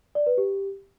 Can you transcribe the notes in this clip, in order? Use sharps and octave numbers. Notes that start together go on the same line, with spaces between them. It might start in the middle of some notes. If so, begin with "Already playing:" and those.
D5
B4
G4